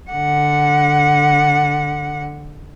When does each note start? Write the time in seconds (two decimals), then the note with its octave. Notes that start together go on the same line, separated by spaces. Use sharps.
0.11 D3 F#5